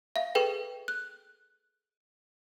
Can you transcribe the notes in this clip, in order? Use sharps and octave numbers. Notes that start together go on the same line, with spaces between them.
E5 F5
G#4 A4 B4 G5
F#6